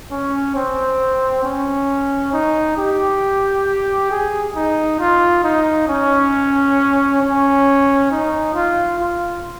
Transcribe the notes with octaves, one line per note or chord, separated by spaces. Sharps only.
C#4
C4
C#4
D#4
G4
G#4
D#4
F4
D#4
C#4
C#4
D#4
F4
F4